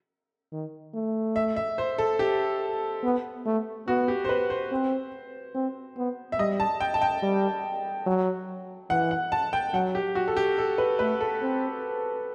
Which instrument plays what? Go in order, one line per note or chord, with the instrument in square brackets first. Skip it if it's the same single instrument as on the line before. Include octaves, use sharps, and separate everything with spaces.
[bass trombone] D#3
A3
[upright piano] E5
E5
C5
A4
G4
[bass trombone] B3
A3
[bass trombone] B3 [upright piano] F#4
[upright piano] G4
C5
B4
C5
[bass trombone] C4
C4
B3
[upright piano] E5
[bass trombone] G3 [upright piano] D#5
[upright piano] A5
G5
A5
G5
[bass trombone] G3
F#3
[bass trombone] E3 [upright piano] F#5
[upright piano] F#5
A5
G5
[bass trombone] F#3 [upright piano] F#5
[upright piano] G4
F#4
A4
G4
A4
B4
[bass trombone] A3 [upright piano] B4
[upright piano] A4
[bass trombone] C4